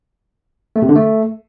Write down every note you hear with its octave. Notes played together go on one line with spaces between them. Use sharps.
A3
C3
D3
A3